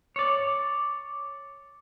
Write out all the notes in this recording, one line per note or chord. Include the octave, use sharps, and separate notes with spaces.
C#5 D5